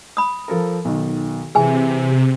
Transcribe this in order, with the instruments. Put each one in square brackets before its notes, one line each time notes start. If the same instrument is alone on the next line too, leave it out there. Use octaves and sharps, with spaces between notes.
[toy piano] B5 D#6
[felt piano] F3 A4 A#4
B1 D#3
[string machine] C3 [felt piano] E3 [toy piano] G#4 G#5